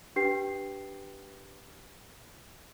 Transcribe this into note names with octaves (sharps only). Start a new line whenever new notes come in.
D4 G4 B4 G5 C7